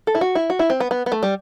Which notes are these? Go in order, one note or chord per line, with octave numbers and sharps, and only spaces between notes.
A4
E4
F#4
E4
F#4
E4
C4
B3
B3
B3
A3
G3